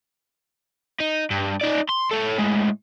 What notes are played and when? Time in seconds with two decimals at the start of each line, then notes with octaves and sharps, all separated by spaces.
1.00 D#4
1.30 G2
1.61 D#4 D5
1.89 C6
2.11 A4 C#5
2.38 A2 G#3